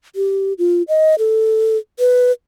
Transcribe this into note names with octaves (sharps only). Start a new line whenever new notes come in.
G4
F4
D#5
A4
B4